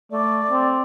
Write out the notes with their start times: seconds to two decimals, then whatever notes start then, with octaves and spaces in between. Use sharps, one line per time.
0.11 A3 D5
0.51 C4